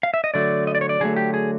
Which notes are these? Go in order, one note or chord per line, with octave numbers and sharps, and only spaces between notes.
F5
E5
D#5
D3 F#3 A3 D5
D#5
D5
C#5
D5
D3 F#3 A3 G#4
G4
G#4